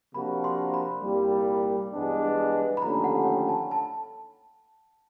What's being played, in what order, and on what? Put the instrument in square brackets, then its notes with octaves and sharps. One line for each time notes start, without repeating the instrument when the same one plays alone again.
[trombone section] C3 F3 A#3 D4 F#4 [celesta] B5
[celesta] C6
B5
[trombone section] C2 A#2 G3
G2 E3 G#3 B3 D4
[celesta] B5
[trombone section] D#2 D3 F3 A3 C#4 [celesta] A#5
[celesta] F#5
G5
A5
A5